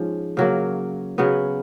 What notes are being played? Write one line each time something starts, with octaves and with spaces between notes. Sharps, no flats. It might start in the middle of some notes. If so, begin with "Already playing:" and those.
Already playing: G#2 F3 C#4
C#3 F#3 A#3
C#3 F#3 B3